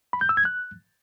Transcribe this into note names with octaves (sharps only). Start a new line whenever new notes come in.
B5
G6
E6
G#6
F#6